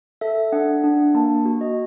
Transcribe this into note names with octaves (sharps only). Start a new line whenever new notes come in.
A4 E5
D4 F#5
D4
A#3 A5
F#4
D#5